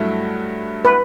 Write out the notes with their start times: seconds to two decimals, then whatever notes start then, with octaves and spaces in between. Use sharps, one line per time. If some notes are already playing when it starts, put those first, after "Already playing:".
Already playing: G2 F#3 A3 E4
0.85 B4